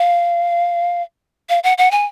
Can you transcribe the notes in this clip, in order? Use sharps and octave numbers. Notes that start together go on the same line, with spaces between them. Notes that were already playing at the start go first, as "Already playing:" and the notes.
Already playing: F5
F5
F#5
F#5
G#5